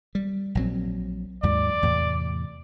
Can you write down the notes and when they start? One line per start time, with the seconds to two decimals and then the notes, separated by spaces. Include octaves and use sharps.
0.15 G3
0.55 A#1 F#3 C4
1.43 D#2 G#2 F#3 D5
1.83 E2 A2 C3